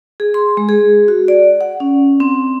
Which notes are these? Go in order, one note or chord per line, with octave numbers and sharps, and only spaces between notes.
G#4
C6
G#3
G#4
F#4
D5
F#5
C#4
C4